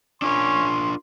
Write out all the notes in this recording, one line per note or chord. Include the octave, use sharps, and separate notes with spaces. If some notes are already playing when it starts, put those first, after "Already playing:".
C#4 D4 F4 A#4 C6